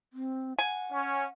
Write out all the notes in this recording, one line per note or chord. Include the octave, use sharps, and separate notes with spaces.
C4
F#5 G#5
C#4